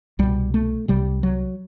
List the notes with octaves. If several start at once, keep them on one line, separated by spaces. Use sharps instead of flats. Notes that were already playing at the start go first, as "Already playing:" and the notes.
C2 B2 G3
A3
C2 C3 G3
F#3